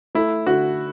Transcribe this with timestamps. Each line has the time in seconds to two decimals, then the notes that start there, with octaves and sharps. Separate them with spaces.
0.15 A3 E4
0.47 D3 F#4